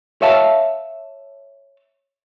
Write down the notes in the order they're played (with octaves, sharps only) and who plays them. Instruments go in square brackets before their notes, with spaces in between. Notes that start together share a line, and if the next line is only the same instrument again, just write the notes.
[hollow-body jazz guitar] C#5 E5 F5 A5